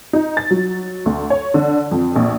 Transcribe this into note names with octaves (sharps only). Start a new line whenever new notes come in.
D#4
A6
F#3
D2
C#5
D3
F2
A#1